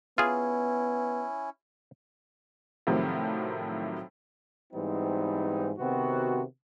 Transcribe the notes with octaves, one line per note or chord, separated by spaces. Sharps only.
B3 C#4 E4 F4 G#4
A2 C3 D#3 F3 F#3
G#2 E3 G3 B3 C4 D#4
C3 D#3 B3 C4 F#4